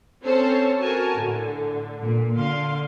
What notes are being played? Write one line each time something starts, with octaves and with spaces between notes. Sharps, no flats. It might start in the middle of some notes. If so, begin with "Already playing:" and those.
C4 C#4 A4 C5 C#5 A5
F#4 A#4 G#5 A5
A2 D3
A#2
D3 F5 C6